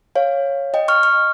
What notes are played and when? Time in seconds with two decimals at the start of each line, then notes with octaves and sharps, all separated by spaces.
0.15 C#5 F5
0.74 D#5 G5
0.88 C#6 F6
1.03 C#6 F6